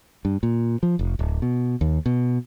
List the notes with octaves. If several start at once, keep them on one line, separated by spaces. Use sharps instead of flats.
G2
A#2
F3
F1
D1
B2
D#2
B2